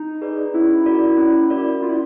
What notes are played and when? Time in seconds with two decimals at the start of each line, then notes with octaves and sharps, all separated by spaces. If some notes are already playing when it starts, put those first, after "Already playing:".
Already playing: D#4
0.21 G#4 B4 D5
0.54 C#4 E4
0.86 F#4 A#4 D5
1.18 C#4
1.50 F#4 A#4 D5
1.82 C#4 F4
1.89 E4